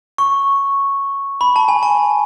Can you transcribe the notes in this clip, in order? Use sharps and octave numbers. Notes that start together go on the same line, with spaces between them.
C#6
B5
A5
G#5
A5